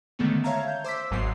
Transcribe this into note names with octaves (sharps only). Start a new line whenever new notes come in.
D3 D#3 G#3 A3 B3 C#4
C#5 E5 F5 A5 A#5 G#6
G6
C5 D6 E6 B6
G#1 G#2 F#3 B3 C7